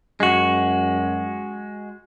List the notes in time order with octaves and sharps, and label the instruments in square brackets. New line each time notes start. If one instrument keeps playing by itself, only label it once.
[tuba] F#2 [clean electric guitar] G#3 F#4